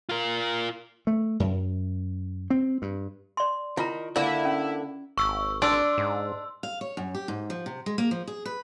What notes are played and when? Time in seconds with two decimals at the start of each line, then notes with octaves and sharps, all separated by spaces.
0.09 F4 A#4
1.07 A3
1.40 F#2
2.50 C4
2.82 G2
3.37 D5 C6
3.77 D#3 E4 F4 A#5
4.16 D3 A#3 E4 D5 A#5
4.45 C#4
5.18 G#1 C#6 E6
5.62 D4 D5 C6 E6
5.98 G#2
6.63 F5
6.81 C#5
6.97 F#2
7.15 G4
7.28 G#2
7.50 F3
7.66 C3
7.86 G#3
7.98 A#3
8.11 F3
8.27 G#4
8.45 B4